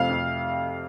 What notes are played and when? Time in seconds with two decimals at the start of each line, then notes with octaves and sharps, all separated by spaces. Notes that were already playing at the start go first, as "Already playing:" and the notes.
Already playing: F2 C3 F3 A3 C4 F5
0.10 F2